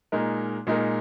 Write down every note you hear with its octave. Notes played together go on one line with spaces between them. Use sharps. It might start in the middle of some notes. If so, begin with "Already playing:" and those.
A#2 G#3 D#4 A#4
A#2 G#3 D#4 A#4